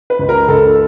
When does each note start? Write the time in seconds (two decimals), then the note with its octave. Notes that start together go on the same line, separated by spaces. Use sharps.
0.10 B4
0.19 C#2
0.29 A#4
0.48 C#2 A4